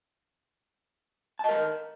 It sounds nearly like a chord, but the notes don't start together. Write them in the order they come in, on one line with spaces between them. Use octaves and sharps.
A5 D#5 A#4